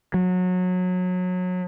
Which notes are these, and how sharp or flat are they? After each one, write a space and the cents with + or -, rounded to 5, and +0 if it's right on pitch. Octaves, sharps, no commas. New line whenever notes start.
F#3 -25